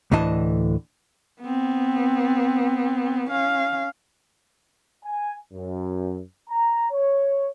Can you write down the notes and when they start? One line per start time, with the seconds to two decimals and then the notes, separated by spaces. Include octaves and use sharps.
0.12 D2 A2 D3 E3 D#5 A5
1.41 B3 C4
3.30 C#4 F5
5.04 G#5
5.53 F#2
6.49 A#5
6.91 C#5